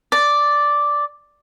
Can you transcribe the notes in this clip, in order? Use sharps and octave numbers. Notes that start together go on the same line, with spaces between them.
D5